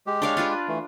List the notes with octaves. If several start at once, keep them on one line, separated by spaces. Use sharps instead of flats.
G#3 G4
D4 C#5 F5
D4 F4 B4
E3 A3